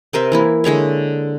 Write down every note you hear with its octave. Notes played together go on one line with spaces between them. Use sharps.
C3 A#4 C5 E5
E3 A#3 E4
D3 G#3 C#5 E5